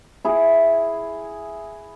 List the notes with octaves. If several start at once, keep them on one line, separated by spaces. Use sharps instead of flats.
E4 G#4